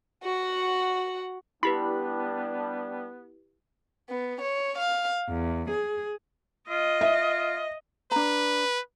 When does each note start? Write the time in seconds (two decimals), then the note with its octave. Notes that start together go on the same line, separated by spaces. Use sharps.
0.23 F#4 F#5
1.63 G3 B3 D4 E4 G4 B4 B5
4.10 B3
4.42 C#5
4.77 F5
5.29 E2
5.69 G#4
6.69 F4 D#5
7.01 E5
8.11 D4 B4 A#5